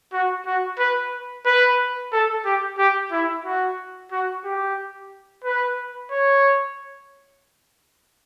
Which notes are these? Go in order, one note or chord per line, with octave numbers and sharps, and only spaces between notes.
F#4
F#4
B4
B4
A4
G4
G4
E4
F#4
F#4
G4
B4
C#5